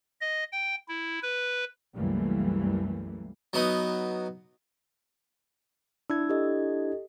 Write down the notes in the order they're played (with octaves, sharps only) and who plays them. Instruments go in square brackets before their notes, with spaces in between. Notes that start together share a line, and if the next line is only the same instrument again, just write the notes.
[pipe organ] D#5
G5
E4
B4
[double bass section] C2 F#2 E3 G3 A3 A#3
[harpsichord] F#3 B3 D#4
[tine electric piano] D4 E4 G#6 [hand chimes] E6
[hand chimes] G4 A4 D#5